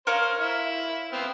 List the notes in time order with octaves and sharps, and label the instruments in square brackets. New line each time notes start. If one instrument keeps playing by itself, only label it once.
[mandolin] A#4 C#5 F5 [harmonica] C5
[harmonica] E4
B3 C4 F5